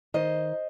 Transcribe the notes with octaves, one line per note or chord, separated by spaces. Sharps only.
D#3 C5 D#5